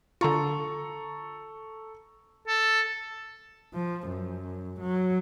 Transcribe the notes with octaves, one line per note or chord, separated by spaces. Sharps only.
D3 F4 A4 A#5 C#6
A4
F3
F#2
F#3